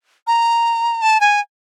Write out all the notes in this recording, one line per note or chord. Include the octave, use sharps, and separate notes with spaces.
A#5
A5
G#5